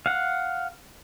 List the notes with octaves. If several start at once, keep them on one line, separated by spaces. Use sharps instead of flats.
F5 F#5